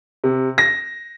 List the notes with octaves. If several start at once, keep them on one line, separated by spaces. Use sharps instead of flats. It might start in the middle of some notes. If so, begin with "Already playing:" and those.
C3
A#6